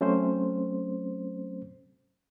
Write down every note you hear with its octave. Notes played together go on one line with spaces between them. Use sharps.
F#3 A3 C4 C#4 C5